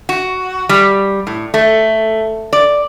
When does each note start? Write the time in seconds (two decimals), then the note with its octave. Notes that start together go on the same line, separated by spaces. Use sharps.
0.09 F#4
0.69 G3
1.27 A2
1.54 A3
2.53 D5